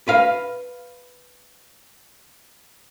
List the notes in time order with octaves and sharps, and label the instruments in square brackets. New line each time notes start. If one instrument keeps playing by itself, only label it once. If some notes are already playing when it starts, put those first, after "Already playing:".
[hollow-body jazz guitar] B4 F5